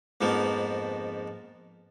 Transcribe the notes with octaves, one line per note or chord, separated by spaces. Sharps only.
F2 G#2 F3 A#3 B3